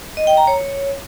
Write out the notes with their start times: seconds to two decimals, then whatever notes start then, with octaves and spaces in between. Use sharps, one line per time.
0.17 D#5
0.27 G5
0.37 A#5
0.47 C#5